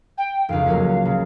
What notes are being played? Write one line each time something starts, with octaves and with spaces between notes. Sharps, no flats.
G5
F1 C#2 F5
F#3 A#3 C#4
C#3